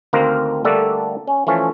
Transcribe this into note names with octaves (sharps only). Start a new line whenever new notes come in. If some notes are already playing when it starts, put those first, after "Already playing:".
D2 D#3 A#3 C4 A#4 F5
D3 G3 A3 A#3 D4 A4
C#4
E3 F3 A3 C#4